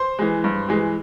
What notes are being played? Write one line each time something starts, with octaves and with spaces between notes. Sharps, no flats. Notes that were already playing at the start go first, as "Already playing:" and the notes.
Already playing: C5 C6
E3 G#3
G2
E3 G#3